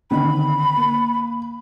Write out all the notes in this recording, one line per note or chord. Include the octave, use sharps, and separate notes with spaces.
D3 D#3 C4 B5
A#3